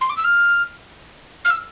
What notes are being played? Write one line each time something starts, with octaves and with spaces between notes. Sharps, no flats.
C6
D6
E6
F6
F6
E6